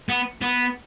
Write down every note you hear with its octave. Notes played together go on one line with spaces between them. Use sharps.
B3
B3